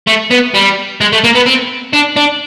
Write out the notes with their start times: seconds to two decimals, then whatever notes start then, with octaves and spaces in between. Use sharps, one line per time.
0.07 A3
0.30 B3
0.54 G3
1.01 G#3
1.12 A3
1.24 A#3
1.35 B3
1.46 C4
1.93 D4
2.16 D4